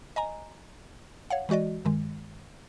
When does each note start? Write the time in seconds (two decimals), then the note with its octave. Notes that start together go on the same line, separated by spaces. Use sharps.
0.16 D#5 G#5 A#5
1.30 C#5 F5 F#5
1.49 E3 G#3 F#4 D5 D#5
1.85 G2 D#3 G#3